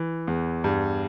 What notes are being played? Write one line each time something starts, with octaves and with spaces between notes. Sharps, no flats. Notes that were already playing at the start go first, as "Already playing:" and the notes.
Already playing: E3
E2
G2